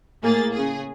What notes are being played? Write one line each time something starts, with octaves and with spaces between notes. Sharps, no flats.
A2 A#3 G#4 A6
C#3 G#4